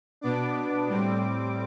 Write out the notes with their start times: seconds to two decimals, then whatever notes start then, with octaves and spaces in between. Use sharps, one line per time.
0.21 B2 B3 D4 D6
0.87 A2 G3 C4